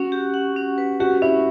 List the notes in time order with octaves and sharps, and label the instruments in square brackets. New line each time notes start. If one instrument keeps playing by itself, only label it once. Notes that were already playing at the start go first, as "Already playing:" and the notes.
Already playing: [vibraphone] C#4 F#5 [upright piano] F#4
[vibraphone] G4
F#5
C#4
B4
[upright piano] F#4 [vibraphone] G4
[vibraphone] C#4 [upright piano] E4